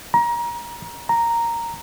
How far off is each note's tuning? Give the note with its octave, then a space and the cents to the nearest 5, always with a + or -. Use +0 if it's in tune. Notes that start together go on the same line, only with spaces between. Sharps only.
A#5 +25
A#5 -5